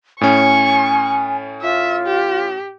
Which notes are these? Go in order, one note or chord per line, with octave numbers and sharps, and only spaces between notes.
A2 C#4 G#5 C#6
F4 E5
G4